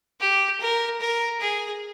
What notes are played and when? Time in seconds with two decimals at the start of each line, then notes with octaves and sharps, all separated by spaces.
0.20 G4
0.60 A#4
1.00 A#4
1.40 G#4